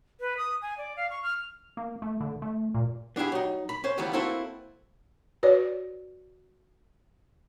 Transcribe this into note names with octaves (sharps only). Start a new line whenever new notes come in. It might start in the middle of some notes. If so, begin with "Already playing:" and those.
B4
D#6
G#5
D5
F5
C#6
F6
A#3
A3
D3
A3
A#2
B3 D4 E4 G4 G#4
F#3 D#4
B5
C#4 C5
C#2 D#3 E3 G3 B3 A4
A#3 C4 E4 F#4 A4 B4
F#4 B4 C#5 D5